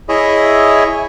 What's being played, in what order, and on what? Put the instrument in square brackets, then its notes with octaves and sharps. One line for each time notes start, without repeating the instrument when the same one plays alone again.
[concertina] E4 G#4 C#5 D#5 E5